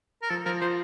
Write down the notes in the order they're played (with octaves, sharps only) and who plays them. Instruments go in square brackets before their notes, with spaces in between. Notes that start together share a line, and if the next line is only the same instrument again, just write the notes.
[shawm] A#4
[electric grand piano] F3 [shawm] A4
[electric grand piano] F3 [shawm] A#4
[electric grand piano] F3 [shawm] C5